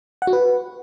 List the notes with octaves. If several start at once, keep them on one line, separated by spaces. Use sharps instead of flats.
F#5
F#4
B4